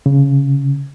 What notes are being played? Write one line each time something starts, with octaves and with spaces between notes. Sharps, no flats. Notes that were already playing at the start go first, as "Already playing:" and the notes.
C#3